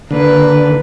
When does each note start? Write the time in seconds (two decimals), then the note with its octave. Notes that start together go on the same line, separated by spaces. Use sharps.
0.11 D3 A#3 B4